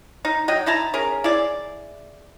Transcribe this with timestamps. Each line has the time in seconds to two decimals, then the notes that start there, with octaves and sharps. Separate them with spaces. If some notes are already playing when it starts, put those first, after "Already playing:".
0.25 D#4
0.48 F#3 D#5 G5
0.66 D#4 E4 A5 A#5
0.94 C#4 G#4 A#4
1.24 E4 G#4 D5